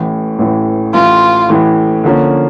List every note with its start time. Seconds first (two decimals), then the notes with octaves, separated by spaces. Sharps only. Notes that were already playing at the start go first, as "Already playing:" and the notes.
Already playing: A1 A2 E3
0.38 A1 A2 E3
0.93 A1 A2 E3 F4
1.49 A1 A2 E3
2.04 D3 F3 A#3 C#4